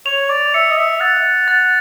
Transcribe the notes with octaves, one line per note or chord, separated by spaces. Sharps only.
C#5 F7
D5
E5 C#7
D#5
E5
F#5 A6
A6